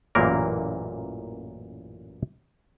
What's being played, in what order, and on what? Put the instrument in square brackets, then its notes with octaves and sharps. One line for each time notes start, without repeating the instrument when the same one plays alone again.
[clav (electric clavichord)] A1 F#2 A#2 E3 A#3 A#4